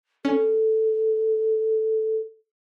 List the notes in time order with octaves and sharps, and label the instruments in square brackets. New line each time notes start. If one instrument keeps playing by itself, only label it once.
[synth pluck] C#4 [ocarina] A4